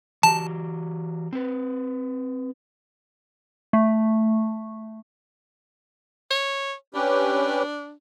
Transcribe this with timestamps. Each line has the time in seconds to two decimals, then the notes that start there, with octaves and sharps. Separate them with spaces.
0.23 E3 F#4 G4 A5
1.33 C4 B4
3.73 A3
6.30 C#5
6.95 C#4 D4 G4 B4